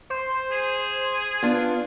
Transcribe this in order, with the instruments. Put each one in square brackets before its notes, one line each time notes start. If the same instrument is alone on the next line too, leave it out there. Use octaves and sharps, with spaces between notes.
[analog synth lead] C5
[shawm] G#4
[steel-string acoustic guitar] B3 D4 [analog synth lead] F4